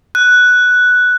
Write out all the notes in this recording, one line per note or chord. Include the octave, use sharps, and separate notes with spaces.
F#6